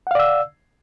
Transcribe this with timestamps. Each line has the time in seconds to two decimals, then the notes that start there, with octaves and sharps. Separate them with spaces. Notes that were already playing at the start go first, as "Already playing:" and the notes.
0.07 F#5
0.11 F5
0.15 D5
0.19 E6